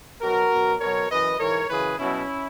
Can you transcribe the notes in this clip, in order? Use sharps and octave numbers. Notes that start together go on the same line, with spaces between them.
B2 F#3 F#4 A#4
B2 F#3
B2 F#3 A#4 C#5
F#2 E3 B4 D#5
G#2 E3 A#4 C#5
F#2 C#3 E3 G#4 B4
B2 F#3 C#4 E4